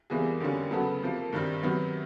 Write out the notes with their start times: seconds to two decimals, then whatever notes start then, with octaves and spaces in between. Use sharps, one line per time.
0.10 E2 C3 E3 G3 A#3 G#4
0.40 F2 D3 G3 A#3 C#4
0.71 C#3 F#3 B3 A4
1.02 C3 F3 A#3
1.33 G2 D#3 G3 C4
1.63 C3 D#3 F#3 B3